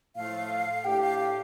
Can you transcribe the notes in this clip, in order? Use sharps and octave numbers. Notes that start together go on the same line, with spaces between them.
A2 F3 A3 F5
A2 A3 D4 G4 G5
F5
F5